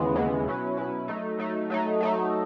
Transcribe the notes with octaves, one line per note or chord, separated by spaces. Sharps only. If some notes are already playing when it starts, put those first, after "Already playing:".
Already playing: D#2 C#3 E3 G#3 B3
D#2 C#3 E3 G#3 B3
B2 F#3 C#4 E4 B4
B2 F#3 C#4 E4 B4
F#3 A3 D#4
F#3 A3 D#4
F#3 A3 D#4
F#3 A3 D#4